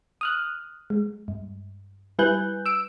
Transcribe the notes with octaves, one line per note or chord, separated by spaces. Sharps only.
D#6 F6 F#6
G#3
G2
G3 E4 B4 G#5 F#6 G6
E6 D7